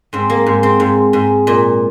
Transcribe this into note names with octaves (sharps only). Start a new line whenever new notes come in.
G#2 C4
A#3
G#2
C4
G#2
G#2
A#2